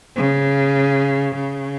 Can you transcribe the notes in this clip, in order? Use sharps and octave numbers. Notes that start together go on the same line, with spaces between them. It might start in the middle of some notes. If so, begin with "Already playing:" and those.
C#3
C#3